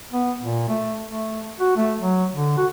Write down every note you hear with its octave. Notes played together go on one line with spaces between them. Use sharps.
B3
A#2
A3
A3
F#4
A3
F#3
D3
F#4